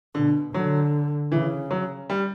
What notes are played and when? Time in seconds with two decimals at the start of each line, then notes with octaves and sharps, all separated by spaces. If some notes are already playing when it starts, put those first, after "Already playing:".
0.15 B2 D3
0.54 D3 F#3
1.32 C#3 E3
1.71 F#3
2.10 G3